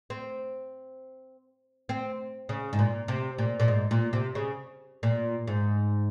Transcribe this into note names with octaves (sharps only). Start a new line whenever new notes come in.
C4
C4
C#3
G#2
A#2
C3
A#2
A#2
G#2
A#2
C3
C#3
A#2
G#2